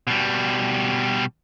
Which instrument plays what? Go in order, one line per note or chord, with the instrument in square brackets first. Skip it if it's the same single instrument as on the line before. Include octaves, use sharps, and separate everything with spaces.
[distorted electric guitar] B2 G3